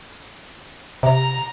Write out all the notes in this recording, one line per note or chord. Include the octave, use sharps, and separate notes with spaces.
C3 A#5